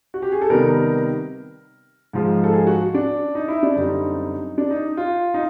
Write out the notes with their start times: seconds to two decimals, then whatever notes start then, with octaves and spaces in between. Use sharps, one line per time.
0.14 F#4
0.22 G4
0.32 G#4
0.42 A4
0.50 C3 D#3 G3 B3 A#4
2.13 G#2 F3 G#3
2.44 A4
2.53 G#4
2.67 F#4
2.94 D4
3.35 D#4
3.48 E4
3.63 D4
3.76 F#2 D3 G3 C4 D#4
4.58 D4
4.71 D#4
4.97 F4
5.34 D#4